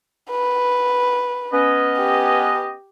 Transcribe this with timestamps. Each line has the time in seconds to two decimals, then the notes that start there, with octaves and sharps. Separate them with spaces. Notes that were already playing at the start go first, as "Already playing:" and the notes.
0.31 B4
1.53 B3 C#4 D#5
1.98 G4